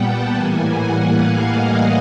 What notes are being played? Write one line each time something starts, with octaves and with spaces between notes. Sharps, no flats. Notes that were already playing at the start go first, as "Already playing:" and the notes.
Already playing: A#2 G3 B3 F#5 G5 A5
A2 E3 G3 A#3 G#5
F#5
F5
D#5